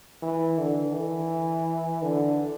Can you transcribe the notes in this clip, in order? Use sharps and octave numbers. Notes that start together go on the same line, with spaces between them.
E3
D3
E3
D3